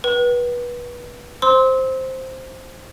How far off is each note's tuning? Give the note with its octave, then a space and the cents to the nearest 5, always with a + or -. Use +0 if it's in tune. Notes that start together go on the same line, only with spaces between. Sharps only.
B4 -25 G5 -40
C5 +0 C6 +0 E6 -30